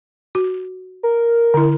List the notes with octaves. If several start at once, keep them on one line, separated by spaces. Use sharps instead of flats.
F#4
A#4
D3 E4